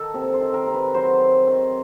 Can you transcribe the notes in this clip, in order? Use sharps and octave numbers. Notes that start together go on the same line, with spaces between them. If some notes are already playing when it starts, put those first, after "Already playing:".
Already playing: D#3 A4
C3 G4
C5
D#3
A#4
C3
B4
F#3 C5
C3
D#3